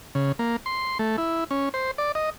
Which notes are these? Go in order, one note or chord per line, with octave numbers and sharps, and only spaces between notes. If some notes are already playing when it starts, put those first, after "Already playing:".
C#3
A#3
C6
A3
E4
C#4
C5
D5
D#5